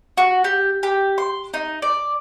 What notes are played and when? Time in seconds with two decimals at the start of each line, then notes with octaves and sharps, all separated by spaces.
0.18 F#4
0.44 G4
0.83 G4
1.18 C6
1.54 D#4
1.82 D5